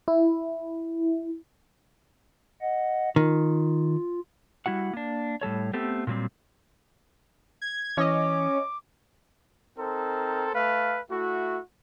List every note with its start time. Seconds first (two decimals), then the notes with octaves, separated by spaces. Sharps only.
0.08 E4
2.61 D#5 F#5
3.16 D#3 F4
4.66 G3 E4 F#4 F#5
4.93 A#3 D4
5.41 A2 G3 A4 C#5
5.73 A3 B3 C4 G4 A4
6.07 A#2 D3 F#3 G3 C4
7.62 G#6
7.97 E3 C#4 C#5 D#5 D6
9.78 C4 D#4 A4 A#4 C5
10.55 A3 A4 B4 F5
11.10 A3 E4 F#4